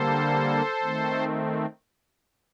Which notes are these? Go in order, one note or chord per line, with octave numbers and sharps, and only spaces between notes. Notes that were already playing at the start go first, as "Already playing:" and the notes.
Already playing: D3 G3 A#3 A4 C5
D#3 A3 C4